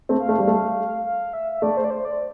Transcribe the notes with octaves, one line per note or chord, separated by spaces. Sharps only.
A3 C4
F5
A3
G3
A3
F5
E5
E5
A3 D5
C5
D5
C5
D5